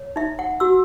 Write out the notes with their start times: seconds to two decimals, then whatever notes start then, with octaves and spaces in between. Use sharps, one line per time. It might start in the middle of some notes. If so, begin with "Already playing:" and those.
Already playing: C#5
0.16 D#4 E5
0.39 F#5
0.60 F#4 E6